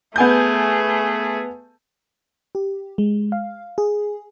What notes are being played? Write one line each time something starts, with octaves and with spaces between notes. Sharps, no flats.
A3 B3 G#4 G#5 G6
G4
G#3
F5
G#4